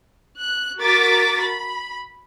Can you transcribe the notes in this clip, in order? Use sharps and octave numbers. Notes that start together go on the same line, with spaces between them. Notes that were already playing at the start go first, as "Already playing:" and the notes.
F#6
F#4 A#4 D6 A6 B6
B5